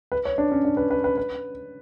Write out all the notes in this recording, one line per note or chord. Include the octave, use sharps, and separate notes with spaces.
B4
C#5
D4
C#4
D4
B4
B4
B4
B4